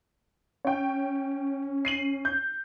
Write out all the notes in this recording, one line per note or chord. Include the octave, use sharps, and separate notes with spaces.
C#4 C#5 G5
C7 D#7 F#7
G6